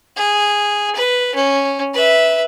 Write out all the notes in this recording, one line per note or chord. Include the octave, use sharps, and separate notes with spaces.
G#4
B4
C#4
B4 E5